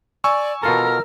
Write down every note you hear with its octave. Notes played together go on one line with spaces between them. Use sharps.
D5 G#5 C#6 E6
B2 F4 A4 A#4 A#5 F6